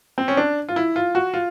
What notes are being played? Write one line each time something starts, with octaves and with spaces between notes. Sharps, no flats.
C4
C#4
D4
F4
E4
F4
F#4
F4